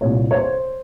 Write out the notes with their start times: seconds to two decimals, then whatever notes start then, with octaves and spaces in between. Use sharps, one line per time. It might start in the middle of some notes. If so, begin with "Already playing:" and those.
0.01 C2 A#2 G3 C#5
0.31 C#5
0.34 C5